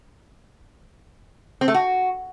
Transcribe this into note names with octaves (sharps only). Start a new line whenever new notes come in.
C4
A3
F#4